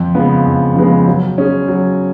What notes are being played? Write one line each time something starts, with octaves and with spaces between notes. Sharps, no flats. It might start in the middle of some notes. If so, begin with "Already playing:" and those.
Already playing: F2
C#3 F3 G#3 B3
F2
C#3 F3 G#3 B3
F#3
C#4 G#4
F#3